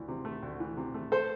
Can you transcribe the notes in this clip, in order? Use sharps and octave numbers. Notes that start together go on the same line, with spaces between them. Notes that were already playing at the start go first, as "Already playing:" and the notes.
Already playing: D2 E3
C3
A3
D2
E3
C3
A3
A4 C5